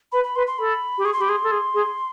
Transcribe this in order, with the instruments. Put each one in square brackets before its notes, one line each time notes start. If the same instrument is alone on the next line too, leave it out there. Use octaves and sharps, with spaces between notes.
[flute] B4 [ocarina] B5
[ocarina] B5
[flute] B4 [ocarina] C6
[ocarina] C6
[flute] A4 [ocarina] B5
[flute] G4
[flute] G#4 [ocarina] C#6
[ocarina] C6
[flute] G4 [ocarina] B5
[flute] G#4 [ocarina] C6
[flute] A4
G#4
G#4